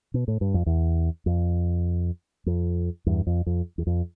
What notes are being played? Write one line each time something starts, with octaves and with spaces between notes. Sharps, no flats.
B2
A2
G2
F2
E2
F2
F2
E2 G2
F2
F2
E2
F2